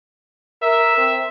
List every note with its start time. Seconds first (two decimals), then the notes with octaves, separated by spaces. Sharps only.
0.62 A#4 E5
0.98 C4